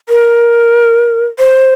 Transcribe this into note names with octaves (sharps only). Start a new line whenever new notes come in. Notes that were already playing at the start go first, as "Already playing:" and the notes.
A#4
C5